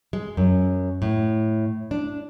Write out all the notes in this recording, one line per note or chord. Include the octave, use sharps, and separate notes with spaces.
G#3
F#2
A2
D4